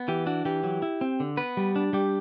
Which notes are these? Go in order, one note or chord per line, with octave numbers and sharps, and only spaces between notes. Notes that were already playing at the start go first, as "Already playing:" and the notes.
Already playing: B3
E3 G4
D4 F#4
E3 G4
F#3
E4
C4
D3
B3 B4
G3
D4
G3 G4